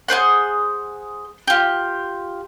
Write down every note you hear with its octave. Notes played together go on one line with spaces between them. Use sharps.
G#4 B4 C5 F#5
F4 G4